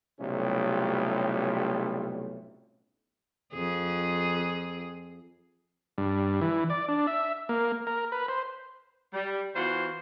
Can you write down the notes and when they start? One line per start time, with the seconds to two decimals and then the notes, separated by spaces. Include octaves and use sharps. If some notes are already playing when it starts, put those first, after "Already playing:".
0.19 B1 A2 C3 G3 C#4 F4
3.53 F2 G#4
5.98 G2
6.41 E3
6.70 D5
6.88 D4
7.07 E5
7.49 A#3
7.87 A#4
8.12 B4
8.28 C5
9.14 G3
9.56 E3 B3 F4 F#4 C5